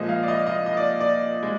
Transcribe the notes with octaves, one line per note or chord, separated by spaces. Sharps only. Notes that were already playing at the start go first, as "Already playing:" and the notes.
Already playing: A#2 F3 G#3 D#5
F5
D5
D#5
D#5
D#5
D5
D5
G#3